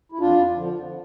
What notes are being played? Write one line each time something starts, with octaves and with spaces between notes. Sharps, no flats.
E4
F2 D4 F4
D3 F3